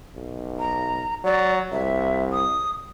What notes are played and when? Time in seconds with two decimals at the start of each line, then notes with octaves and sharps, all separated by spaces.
0.16 B1
0.59 A#5
1.24 F#3 D5
1.72 C2 E5
2.32 D#6